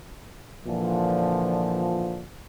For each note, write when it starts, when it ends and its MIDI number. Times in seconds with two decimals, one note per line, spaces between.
0.66 2.25 46
0.66 2.25 50
0.66 2.25 52
0.66 2.25 53